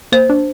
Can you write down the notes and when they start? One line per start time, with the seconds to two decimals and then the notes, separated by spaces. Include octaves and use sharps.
0.12 A#3 C5
0.29 D4